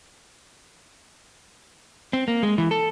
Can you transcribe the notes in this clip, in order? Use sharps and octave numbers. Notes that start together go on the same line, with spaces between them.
C4
A#3
G#3
E3
A4